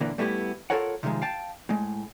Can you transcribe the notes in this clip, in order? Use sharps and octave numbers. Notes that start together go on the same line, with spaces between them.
A#2 D3 E3 A#3
G3 A3 B3 E4 G4
F4 F#4 A4 A#4 C#5 F#5
C3 D#3 F3 F#3 G#3
F5 G5 A5
A2 G#3